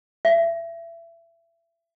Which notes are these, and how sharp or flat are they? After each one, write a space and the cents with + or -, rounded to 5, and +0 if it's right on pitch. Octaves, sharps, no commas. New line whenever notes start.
E5 +25